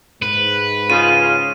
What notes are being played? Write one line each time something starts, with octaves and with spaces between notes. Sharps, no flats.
G#2 B4
C#3 F4 D#7